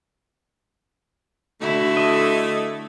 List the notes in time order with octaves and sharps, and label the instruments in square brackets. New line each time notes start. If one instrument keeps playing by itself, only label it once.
[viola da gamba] D3 E4 F#4 [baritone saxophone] A3
[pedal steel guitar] D#5